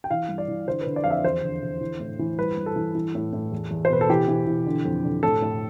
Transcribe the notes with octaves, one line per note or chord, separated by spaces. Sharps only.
G5
E3 F5
G2
D5
E3
D3 C5
D3 B4
D5
F2 F5
E5
E2 C5
D3
D3
E3
A2
E3
G2 B4
G2
A4
E3
E3
A2
A2
E2
E2
C5
B2 B4
A4
E3 G4
E3
E3
D3
F2
D3
A2 A4
A2